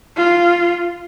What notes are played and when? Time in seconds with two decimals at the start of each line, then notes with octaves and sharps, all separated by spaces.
0.17 F4